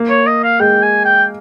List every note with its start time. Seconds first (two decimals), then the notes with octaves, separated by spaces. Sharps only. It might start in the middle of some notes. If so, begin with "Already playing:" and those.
Already playing: A#3
0.09 C#5
0.27 D#5
0.44 F5
0.60 G#3 G5
0.83 G#5
1.05 G5